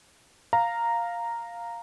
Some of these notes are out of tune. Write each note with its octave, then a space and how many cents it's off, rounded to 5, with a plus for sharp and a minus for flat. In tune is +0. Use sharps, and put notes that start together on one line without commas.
F5 +0 A#5 -5